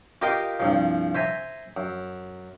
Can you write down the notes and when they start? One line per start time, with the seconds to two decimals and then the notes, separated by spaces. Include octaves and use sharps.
0.22 F4 G4 A#4 D#5 F5 G5
0.60 C2 G2 F3
1.15 C5 E5 G#5 A#5
1.77 F#2